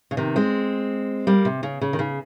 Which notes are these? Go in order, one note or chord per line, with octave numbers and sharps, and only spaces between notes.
C#3
C3 D#3
G#3 C4
G3 A#3
C3
C#3
C#3
D#3
C#3